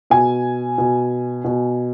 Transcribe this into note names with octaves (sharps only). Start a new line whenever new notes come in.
B2 G#5
B2
B2